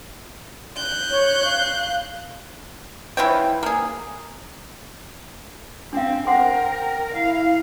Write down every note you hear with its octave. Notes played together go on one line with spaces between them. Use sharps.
F#6 G6
C#5
F5
E3 F4 C#5 G5
A#3 G#4
C4 D4 F5 G5
A#4 C5 F#5 G5 C6
E4 F5